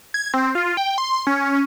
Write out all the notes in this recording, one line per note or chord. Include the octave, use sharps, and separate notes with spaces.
G#6
C4
F4
G5
C6
C#4